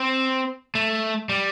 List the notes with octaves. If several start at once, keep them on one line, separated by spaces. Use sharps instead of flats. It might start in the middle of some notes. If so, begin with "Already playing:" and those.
Already playing: C4
A3
G3